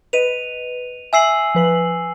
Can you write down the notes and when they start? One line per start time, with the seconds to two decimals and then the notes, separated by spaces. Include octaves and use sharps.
0.13 B4 D#5 D#7 F7
1.13 E5 G#5 E6 C7 F#7
1.55 F3 B4 F#7